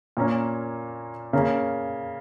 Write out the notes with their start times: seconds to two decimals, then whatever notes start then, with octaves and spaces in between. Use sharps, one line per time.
0.17 A#2 A#3 C#4
1.33 C#3 A#3 C#4